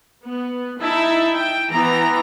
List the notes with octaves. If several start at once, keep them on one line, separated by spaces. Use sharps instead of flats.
B3
D#4 E4 E5 A5
G5
E3 B3 A#5